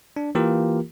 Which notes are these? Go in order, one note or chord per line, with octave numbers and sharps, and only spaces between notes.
D4
E3 A#3 F4 G4 A#4